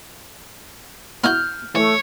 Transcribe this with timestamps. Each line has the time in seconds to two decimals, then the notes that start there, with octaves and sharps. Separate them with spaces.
1.24 B3 E4 F#4 F6 G6
1.75 E3 A3 C#5